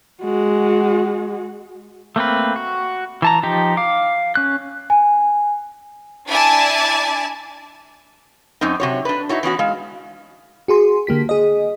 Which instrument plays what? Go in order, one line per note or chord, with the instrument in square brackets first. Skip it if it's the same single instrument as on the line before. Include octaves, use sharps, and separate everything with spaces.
[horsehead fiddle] G#3 F#4
[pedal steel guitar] A3 A#3 C4 B4
F#4
E3 A5 A#5
F3 D#4 G4
F5 D6
C#4 F#6
[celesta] G#5
[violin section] D4 E4 D5 G#5 A5
[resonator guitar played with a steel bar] F#2 F#3 C4 D#4
C3 F#3 C#5
D4 B4
D#4 E4 F#4 C#5
E3 B3 C#4 F#4
G#3 F5
[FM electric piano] F#4 G#4 C6
D3 A#3 G4 B6
G#4 D#5